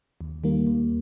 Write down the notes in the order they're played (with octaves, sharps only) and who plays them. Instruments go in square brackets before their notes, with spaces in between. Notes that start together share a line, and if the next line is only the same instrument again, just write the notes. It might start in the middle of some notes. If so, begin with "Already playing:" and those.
[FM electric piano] D#2
D#3 G3 A#3
D#2